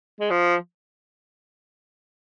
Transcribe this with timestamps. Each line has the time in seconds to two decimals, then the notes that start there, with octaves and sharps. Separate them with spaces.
0.20 G#3
0.30 F3